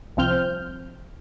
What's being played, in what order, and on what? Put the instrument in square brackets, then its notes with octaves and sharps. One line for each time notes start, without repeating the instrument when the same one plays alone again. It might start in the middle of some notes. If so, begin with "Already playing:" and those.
[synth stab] C2 F3 C4 F6 G6